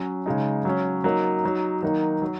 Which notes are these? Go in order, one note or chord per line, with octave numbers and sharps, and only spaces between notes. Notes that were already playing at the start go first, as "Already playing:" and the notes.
Already playing: F#3 C#4
C#3 G#3 D#4
F#3 C#4
F#3 A#3 D#4
F#3 D#4
D#3 F#3 A#3 D#4
F#3